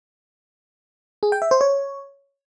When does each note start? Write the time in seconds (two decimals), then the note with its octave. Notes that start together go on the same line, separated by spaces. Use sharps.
1.23 G#4
1.32 G5
1.42 E5
1.51 C5
1.61 C#5